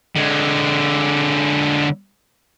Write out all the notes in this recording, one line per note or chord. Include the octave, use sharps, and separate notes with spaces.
D3 G#3